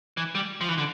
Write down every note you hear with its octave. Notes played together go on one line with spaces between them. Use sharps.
E3
G3
F3
E3
D3